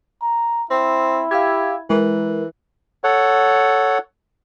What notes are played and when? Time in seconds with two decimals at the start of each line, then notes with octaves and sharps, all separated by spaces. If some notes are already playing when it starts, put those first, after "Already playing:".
0.22 A#5
0.71 C4 E4
1.31 G4 F5 E6 G#6
1.90 E3 G#3 A#4
3.04 A4 C#5 F#5